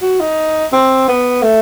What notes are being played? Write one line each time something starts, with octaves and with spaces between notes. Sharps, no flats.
F#4
D#4
C4
B3
A3